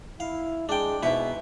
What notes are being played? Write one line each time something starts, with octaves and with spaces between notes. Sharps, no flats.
E4 F5
G#3 D4 G5
G#2 B2 E4 B4 E5